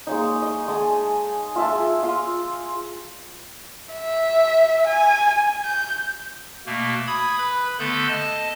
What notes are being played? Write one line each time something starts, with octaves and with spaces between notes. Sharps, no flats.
G#3 A#3 C#4 D#4
D#5
G#3 G#5 A5 D#6
F4 E5 A5
G#4
F4 F5 C6 E6
E5
G#5
G6
B2 A3 A#3
B5 D#6 G#6
B4 B5
D3 A3 B3 A4 C6 G6
D#5 A5